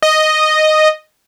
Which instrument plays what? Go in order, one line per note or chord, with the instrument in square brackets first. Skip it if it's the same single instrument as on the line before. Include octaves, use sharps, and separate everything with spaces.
[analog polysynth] D#5